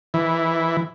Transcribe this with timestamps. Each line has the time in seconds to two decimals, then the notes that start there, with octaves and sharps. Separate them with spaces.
0.14 E3